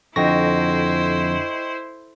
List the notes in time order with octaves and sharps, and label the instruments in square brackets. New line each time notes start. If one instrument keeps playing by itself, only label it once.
[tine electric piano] F2 A#6 [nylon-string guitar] D3 [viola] E4 C5 [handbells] D#5 G5 C#6